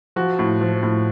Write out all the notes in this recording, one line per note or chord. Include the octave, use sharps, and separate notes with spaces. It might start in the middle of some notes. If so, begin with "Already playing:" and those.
F3 F#4
A2
F3
A2